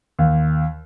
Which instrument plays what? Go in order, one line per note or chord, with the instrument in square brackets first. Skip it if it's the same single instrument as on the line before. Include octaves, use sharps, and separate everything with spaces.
[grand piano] D#2